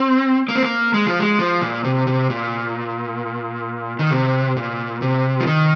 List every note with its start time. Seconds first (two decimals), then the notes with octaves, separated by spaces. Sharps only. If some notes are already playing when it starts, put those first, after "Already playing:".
Already playing: C4
0.48 A#3
0.56 C4
0.63 A#3
0.94 G#3
1.06 F3
1.19 G#3
1.39 F3
1.61 A#2
1.84 C3
2.07 C3
2.30 A#2
3.99 D#3
4.11 C3
4.57 A#2
5.02 C3
5.40 F3
5.47 D#3